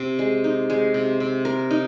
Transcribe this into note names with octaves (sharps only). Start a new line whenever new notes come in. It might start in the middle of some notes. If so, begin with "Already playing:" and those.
Already playing: C3
G#3
D#4
G#3
C3
C3
A#4
D#4